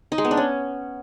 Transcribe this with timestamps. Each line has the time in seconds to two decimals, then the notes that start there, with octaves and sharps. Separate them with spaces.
0.12 D#4
0.18 G#3
0.25 B3
0.31 D4
0.37 C#4